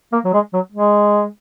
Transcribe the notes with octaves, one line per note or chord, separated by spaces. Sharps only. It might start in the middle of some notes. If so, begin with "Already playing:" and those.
A#3
F#3
G#3
F#3
G#3